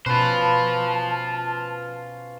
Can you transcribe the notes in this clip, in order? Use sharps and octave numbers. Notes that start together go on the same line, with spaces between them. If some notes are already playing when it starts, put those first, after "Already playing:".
B2 C#4 F4 B4 C5 A5